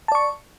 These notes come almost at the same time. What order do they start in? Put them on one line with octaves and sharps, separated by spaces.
A5 D5 C#6